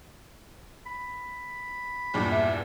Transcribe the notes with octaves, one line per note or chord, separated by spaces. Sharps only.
B5
E2 G2 A#2
E5